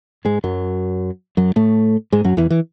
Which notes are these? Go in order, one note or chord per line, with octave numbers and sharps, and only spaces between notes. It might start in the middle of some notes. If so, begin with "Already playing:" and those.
G#2 G#3
F#2 F#3
F#2 F#3
A2 A3
G#2 G#3
F#2 F#3
E2 E3
E3